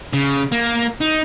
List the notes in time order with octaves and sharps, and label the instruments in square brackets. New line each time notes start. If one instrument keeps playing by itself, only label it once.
[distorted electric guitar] C#3
A#3
D#4